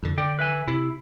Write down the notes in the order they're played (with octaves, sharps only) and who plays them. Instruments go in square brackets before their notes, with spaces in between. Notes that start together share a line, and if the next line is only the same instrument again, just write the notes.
[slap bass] F2 D3
[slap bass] D3 [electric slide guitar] D5 G5
[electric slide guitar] B4 E5 G#5
[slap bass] C3 [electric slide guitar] E4